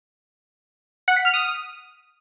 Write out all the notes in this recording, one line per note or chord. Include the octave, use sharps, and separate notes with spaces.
F#5
B6
F6
D#6